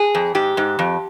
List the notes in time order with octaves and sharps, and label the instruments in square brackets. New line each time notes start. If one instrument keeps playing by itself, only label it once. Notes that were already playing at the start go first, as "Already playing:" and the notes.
Already playing: [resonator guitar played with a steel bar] G#4
F2
G#2 G4
G#2
F2